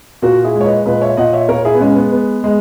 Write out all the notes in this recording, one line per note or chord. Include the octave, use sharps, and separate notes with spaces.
A#2 F#4 A#4
E4 G#4
G#3
C#5
B4 D#5
A#2 B4 D#5
C#5 E5
A#2 D#5 F#5
C#5 E5
A#2 A#4 C#5
E4 G#4
B3
G#3 C#4
B3
B3
G#3